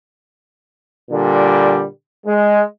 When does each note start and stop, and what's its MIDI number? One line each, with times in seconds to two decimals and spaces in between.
1.11 1.84 46
1.11 1.84 50
1.11 1.84 55
2.26 2.63 56